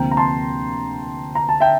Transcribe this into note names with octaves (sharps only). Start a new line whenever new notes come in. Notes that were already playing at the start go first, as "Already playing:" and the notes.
Already playing: D2 C3 F3 A#3 G5 A#5
A#5
A5 C6
A#5
A5
E5 G5